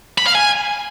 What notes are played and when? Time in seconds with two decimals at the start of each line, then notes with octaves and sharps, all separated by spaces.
0.18 B5
0.26 F5
0.35 G#5